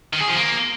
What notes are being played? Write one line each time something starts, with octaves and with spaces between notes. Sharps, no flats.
D#3
G#4
F3
A#3